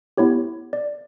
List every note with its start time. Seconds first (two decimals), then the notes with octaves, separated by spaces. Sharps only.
0.17 B3 E4 G4 C#5
0.73 D5